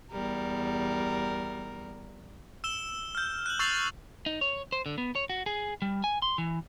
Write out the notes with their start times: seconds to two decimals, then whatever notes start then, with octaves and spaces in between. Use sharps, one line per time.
0.12 E2 G3 A#4
2.64 E6 E7 G7
3.15 F6 G6
3.46 F#6 F#7
3.59 C#6 E6 A6 C7 F7 F#7
4.26 D#4
4.41 C#5
4.72 C5
4.86 D3
4.98 B3
5.15 C#5
5.30 F#4
5.46 G#4
5.82 G3
6.04 G#5
6.22 C6
6.38 E3